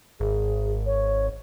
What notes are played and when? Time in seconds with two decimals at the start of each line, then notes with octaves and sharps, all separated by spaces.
0.20 G#1 G#4
0.86 C#5